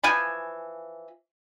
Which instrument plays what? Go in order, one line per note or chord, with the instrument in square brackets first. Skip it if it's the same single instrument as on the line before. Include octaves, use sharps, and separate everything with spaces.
[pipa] E3 F3 G#5 B5